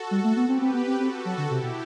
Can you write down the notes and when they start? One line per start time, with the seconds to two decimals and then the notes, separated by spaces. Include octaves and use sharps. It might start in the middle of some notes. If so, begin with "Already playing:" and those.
Already playing: F#4 A4
0.11 G3
0.24 A3
0.37 B3
0.48 C4 G4 B4
0.62 C4
0.74 B3
0.87 C4
0.99 C4 F#4 A4
1.25 F#3
1.38 D3
1.50 C3 E4 G4
1.63 B2